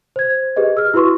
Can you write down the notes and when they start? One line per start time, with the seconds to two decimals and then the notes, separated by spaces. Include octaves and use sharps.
0.16 C5 G#6
0.56 G4 G#4 B4 D#5
0.77 E6 F6
0.94 E4 F#4 B4 C6 C#6